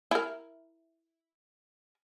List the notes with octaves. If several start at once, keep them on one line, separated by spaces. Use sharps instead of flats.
E4 A#4